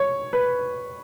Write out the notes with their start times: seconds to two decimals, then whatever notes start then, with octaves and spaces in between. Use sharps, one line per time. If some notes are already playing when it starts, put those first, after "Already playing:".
Already playing: C#5
0.33 B4